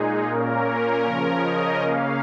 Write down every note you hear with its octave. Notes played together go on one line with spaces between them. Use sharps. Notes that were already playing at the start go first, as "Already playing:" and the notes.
Already playing: A#2 G#3 D#4 G#4
A#2 A#3 C#4 A#4
C#3 F3 C#4 A#4
D#5
C#3 A#3 C#4 F5